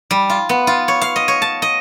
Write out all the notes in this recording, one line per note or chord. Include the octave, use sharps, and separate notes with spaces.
G3
F4
B3
F4
C#5
F5
D#5
C#5
A5
D#5